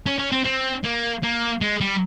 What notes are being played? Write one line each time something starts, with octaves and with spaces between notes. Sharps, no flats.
C#4
C#4
C4
C4
A#3
A#3
G#3
G3